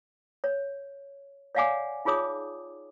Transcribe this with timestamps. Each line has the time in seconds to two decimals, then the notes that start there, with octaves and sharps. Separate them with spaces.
0.44 C#5
1.55 C#5 D5 F5 F#5 G#5 D6
2.05 D#4 F4 G#4 C#5 D6 D#6